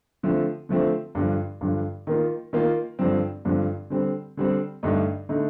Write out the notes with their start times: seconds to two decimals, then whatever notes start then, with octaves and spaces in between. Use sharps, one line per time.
0.23 D3 F3 A3 C4
0.69 D3 F3 A3 C4
1.15 G2 D3 F3
1.61 G2 D3 F3
2.07 D#3 A#3 F4
2.53 D#3 A#3 F4
2.99 G2 D3 F3 C4
3.45 G2 D3 F3 C4
3.90 D3 G3 C4
4.37 D3 G3 C4
4.83 G2 D3 A3 D#4
5.29 D3 A3 D#4